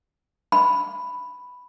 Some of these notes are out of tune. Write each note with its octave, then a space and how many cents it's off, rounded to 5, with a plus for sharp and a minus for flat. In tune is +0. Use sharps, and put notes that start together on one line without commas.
B5 +5